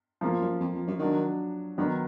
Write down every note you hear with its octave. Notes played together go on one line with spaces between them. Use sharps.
F2 F3 A#3 F4
F#2
F2
F2
F#2
D#3 F#3 D4 F#4
D3 D#3 F#3 B3